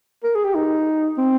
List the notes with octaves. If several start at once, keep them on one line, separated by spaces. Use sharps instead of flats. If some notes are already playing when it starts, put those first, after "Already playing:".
A#4
G#4
G4
D#4
C4